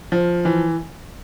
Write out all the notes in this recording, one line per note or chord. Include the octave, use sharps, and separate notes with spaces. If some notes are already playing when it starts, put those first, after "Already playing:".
F3
E3